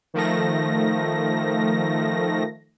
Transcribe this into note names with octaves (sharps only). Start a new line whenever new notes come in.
D#3 F3 A3 A#6